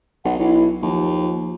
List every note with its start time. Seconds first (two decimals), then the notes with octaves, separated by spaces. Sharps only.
0.25 B1 F#5
0.39 B1 E4
0.82 D#2 F3